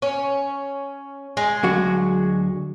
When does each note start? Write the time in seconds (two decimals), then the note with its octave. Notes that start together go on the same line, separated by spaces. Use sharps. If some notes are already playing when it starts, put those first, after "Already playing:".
0.02 C#4
1.37 G#3
1.63 D2 F#3 F#4